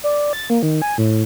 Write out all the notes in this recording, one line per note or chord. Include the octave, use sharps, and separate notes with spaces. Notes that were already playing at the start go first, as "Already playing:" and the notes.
D5
A6
A#3
D#3
G#5
A2